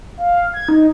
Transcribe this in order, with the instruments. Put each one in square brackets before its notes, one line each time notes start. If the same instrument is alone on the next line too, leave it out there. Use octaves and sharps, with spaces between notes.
[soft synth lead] F5
G#6
D#4